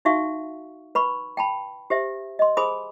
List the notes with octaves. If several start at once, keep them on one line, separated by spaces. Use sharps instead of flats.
D#4 F#4 E5 F5 C#6
B4 B5 C#6
G5 A5 B5
G4 C5 E5
D#5 C6
G#4 C5 G#5 B5 D#6